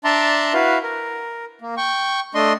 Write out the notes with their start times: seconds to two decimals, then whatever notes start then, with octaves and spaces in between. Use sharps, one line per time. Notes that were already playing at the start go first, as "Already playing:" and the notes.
0.04 D4 D5 E5 A5 A#5 C6
0.54 E4 F#4 B4 F5
0.83 A#4
1.62 A#3
1.77 G5 C#6
2.35 A3 D4 D#5 C6